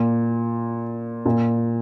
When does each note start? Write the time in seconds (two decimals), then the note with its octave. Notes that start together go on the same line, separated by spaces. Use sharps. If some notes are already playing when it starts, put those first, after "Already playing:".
Already playing: A#2
1.26 A#2